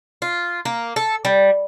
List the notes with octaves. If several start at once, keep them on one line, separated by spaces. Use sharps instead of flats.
F4
A#3
A4
G3